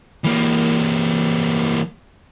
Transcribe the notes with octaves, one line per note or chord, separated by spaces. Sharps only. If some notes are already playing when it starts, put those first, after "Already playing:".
E3 A#3